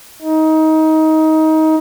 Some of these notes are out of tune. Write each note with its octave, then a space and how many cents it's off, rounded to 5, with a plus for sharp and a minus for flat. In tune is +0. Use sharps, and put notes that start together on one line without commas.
D#4 +20